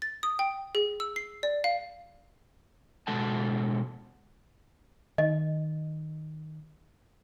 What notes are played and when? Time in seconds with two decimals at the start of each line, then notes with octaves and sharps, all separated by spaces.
0.02 A6
0.23 D#6
0.39 G5
0.75 G#4
1.00 E6
1.16 C7
1.43 D5
1.64 F5
3.07 B2 G#3 A4 F#5 A5
5.18 D#3 D#5